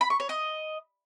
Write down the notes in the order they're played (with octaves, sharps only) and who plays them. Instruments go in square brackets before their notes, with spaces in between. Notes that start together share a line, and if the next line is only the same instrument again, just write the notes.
[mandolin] B5
C#6
C#5
D#5